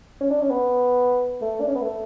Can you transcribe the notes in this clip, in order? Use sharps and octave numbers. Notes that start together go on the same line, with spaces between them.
C#4
D4
C#4
B3
A3
D4
C#4
B3
A3